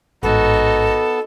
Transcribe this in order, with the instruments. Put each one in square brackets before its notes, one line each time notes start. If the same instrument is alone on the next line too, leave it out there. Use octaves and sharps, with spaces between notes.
[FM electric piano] A1 G#2 [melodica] B3 [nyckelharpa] D#4 F#4 [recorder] A4